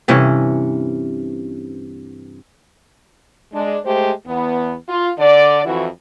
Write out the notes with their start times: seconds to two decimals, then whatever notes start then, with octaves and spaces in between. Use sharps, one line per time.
0.08 G2 C3 E3 C#4
3.53 G#3 D4
3.84 G#3 A3 G4 C5
4.26 E2 B3
4.89 F4
5.19 D3 D5
5.65 F2 E3 E4 F#4